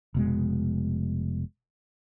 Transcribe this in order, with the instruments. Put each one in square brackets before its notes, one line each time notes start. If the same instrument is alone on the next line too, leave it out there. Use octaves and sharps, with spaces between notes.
[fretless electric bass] F1 B2 G#3